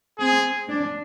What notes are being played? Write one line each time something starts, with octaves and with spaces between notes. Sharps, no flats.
C4 G#4
D4